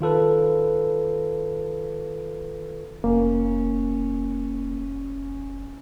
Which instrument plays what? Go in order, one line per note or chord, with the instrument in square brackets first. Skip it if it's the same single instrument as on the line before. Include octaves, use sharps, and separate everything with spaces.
[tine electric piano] D#3 F4 A4 B4
[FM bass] F1 [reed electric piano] A#3 [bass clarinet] C#4